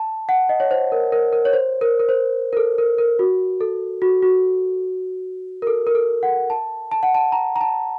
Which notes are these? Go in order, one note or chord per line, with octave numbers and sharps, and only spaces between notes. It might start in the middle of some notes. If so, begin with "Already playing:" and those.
Already playing: A5
F#5
D#5
C#5
C5
A#4
A#4
A#4
C#5
C5
A#4
A#4
C5
A#4
A4
A#4
A#4
F#4
A4
F#4
F#4
A#4
A4
A#4
A4
F#5
A5
A5
F#5
A5
A#5
A#5
A5